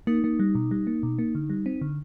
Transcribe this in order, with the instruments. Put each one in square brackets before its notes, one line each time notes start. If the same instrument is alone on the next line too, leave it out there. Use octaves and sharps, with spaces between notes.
[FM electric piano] A#3 [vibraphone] D#4
[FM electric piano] A#3
G3
B2
G3
A#3
B2
A#3
D3
G3
C4
D3